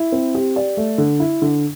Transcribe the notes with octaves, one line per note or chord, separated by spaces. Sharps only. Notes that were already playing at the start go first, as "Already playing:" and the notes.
Already playing: E4
C4
G4
D5
A3
D3
E4
D3